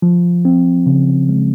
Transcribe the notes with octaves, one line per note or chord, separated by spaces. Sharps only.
F3
C4
C#3
G#3